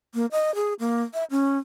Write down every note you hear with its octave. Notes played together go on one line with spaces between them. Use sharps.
A#3
D#5
G#4
A#3
E5
C#4